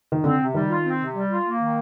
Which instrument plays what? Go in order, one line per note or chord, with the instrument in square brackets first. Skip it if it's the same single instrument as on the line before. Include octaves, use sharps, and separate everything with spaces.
[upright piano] D#3
[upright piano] D3 [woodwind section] C4
[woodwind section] C3
[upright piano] D#3 [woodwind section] G3
[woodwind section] F4
C4
C3
G3
F4
A#3
D#3